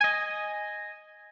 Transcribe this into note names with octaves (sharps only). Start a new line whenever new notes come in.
D#5 G#5